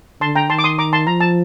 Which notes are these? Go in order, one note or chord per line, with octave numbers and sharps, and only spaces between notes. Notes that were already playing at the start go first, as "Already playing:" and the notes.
D3 A5 C6
G5 A#5
D#3 A5 C6
D6
C6 D#6
A#5 D6
A5 C6
F3 A#5
A5